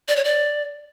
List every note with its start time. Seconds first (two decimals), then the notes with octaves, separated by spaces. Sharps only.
0.08 D5
0.16 C#5
0.24 D5